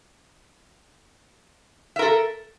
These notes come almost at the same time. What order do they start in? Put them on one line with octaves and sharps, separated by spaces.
E5 A#4 A4